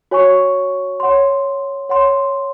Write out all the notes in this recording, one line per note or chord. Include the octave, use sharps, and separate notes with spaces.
F#4 C#5 G#5 C#6
C#5 F#5 C6
C#5 F#5 C6